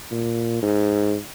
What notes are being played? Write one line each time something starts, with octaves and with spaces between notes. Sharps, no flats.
A#2
G#2